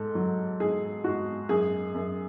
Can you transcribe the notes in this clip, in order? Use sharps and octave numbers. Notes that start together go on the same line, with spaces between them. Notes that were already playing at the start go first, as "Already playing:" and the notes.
Already playing: G#2 A4
F#3
G#2 G#4
G#2 F#4
F#2 G#4
F#2